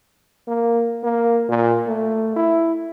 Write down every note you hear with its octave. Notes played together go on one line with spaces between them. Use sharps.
A#3
A#3
A#2
A3
E4